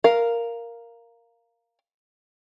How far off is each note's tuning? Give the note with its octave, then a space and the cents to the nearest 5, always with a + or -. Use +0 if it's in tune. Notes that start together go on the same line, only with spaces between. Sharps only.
A#4 +0 F5 -5